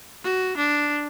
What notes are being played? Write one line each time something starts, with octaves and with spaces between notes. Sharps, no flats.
F#4
D4